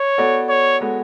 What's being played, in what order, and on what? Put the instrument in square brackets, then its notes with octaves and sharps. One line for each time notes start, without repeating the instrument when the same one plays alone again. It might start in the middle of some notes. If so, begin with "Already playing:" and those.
Already playing: [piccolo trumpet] C#5
[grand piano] B3 F#4 A4 D5
[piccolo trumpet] C#5
[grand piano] G#3 B3 F#4 A4